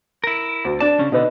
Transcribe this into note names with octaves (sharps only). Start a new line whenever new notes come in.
E4 A#4
D2
D4 D5 A5
C#3 C#4
B2 D3 D#4 B4 D#5